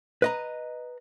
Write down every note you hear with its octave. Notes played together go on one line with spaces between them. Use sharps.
B4 D#5 A#5